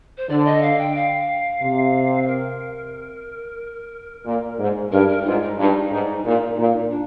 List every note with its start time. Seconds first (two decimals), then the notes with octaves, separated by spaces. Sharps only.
0.18 C5
0.29 D3 D5
0.45 D#5
0.62 F5
0.79 G5
0.95 F5
1.62 C3
2.27 A#4
4.26 A#2
4.59 G#2
4.92 G2 A#4
5.08 A#4
5.21 D#4
5.25 G#2 F4
5.42 D#4
5.58 G2 D#4
5.91 G#2
6.25 A#2
6.58 A#2
6.90 D4